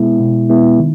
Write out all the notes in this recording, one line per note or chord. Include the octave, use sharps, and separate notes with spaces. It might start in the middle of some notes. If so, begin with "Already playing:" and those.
Already playing: B2 G#3 B3 E4
B2
G#3 B3 E4
D#3